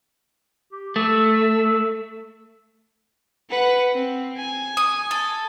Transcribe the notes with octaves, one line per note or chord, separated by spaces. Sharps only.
G4
A3 E6
B4 F#5
C4
G#5
D#6
A4